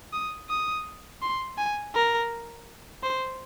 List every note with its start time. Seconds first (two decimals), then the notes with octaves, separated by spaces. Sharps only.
0.13 D#6
0.49 D#6
1.22 C6
1.58 G#5
1.95 A#4
3.03 C5